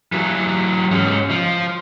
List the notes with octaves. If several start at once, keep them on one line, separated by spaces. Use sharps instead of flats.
E3 F#3
G#2 C#4
F3